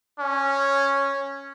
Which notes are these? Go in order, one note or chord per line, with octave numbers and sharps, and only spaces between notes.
C#4